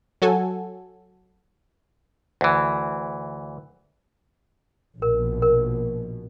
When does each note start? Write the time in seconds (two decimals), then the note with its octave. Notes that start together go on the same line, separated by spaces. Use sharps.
0.22 F#3 F#4 A4 G#5
2.41 D2 E3
5.02 A#1 B2 A#4
5.42 A#4